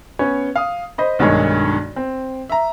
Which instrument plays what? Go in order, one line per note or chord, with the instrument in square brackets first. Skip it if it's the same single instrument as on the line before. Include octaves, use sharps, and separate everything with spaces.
[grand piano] B3 C#4 C#5
F5 D#6
C5 D#5 B5
B1 G2 D#3 G#3 C#5
C4
E5 A#5